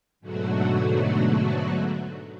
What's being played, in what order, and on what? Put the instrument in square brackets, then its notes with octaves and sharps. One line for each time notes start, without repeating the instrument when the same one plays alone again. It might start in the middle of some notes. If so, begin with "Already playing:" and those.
[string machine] G#2 B2 D3 F#3 A3 F#4